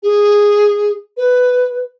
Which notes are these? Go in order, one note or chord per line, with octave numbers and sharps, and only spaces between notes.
G#4
B4